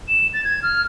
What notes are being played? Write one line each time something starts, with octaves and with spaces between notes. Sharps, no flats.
E7
A6
G#6
F6